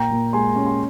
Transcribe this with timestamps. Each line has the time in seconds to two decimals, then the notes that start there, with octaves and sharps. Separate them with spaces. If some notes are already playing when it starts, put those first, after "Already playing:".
Already playing: A#2 G5 A#5
0.11 A#2
0.33 G#3 G#5 C6
0.56 C#4
0.66 C6